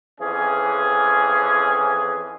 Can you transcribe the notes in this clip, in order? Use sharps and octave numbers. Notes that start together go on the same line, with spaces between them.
F2 E3 C#4 G#4